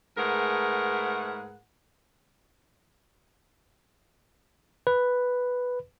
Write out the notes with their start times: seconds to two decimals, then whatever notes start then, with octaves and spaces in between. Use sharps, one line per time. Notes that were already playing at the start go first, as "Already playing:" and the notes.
0.18 G#2 A3 G#4 A#4 B4 F#5
4.87 B4